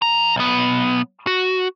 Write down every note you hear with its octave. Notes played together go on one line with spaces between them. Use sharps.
E3 A#5
B1 B3
F#4